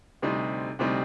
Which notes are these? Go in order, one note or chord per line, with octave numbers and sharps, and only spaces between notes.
D2 C3 G3 C4 D#4
D2 C3 G3 C4 D#4